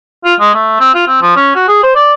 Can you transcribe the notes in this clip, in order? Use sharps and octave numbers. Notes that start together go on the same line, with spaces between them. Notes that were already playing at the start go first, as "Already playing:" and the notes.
F4
G#3
A3
C4
F4
C4
F3
C#4
F#4
G#4
C5
D5